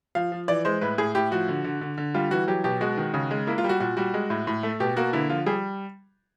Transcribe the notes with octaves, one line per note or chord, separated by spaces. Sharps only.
F3 F5
F3
E3 D5
G#3 C5
A2 B4
A2 G#4
A2 G4
F3 F#4
D3
D3
D3
D3
G3 F4
E3 F#4
F#3 G4
B2 G4
G#3 F#4
D#3
C#3
G#3
A#3 E4
F4
G3
F#4
A#2 F#4
G3 F#4
G#3
A2
A2
A3
B2 G4
A#3 F#4
D3 E4
F3 F4
G3 G#4